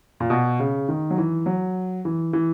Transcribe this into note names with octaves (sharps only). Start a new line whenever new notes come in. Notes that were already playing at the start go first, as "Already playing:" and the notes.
A#2
B2
C#3
D#3
F#3
E3
F#3
E3
E3